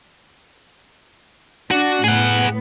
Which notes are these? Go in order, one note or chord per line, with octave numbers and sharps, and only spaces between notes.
D4 F#4
A2 B3 G#4 F#5